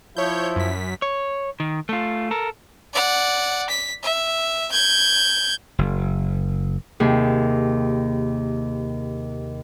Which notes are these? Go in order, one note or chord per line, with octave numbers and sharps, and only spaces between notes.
F3 E4 C#5 G6
F#2 B6
C#5
D#3
A3 F4
A4 A#4
D5 F#5
B6
E5
G6 G#6
F#1
D#2 C3 G#4